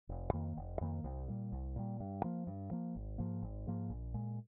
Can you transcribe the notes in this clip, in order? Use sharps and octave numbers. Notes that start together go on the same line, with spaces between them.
F1
F2 D#3 A#3
F1
F2 D#3 A#3
C2
A#2 G3
C2
A#2 G3
G2
F3 A#3
G2
F3 A#3
G#1
G#2 F3 A#3
G#1
G#2 F3 A#3
A#1
A#2 G#3